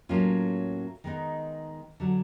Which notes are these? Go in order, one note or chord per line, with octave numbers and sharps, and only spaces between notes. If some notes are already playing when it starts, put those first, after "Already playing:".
A2 F#3 A#3 C#4 F4
D#3 G#3 B3 D#4
D3 F#3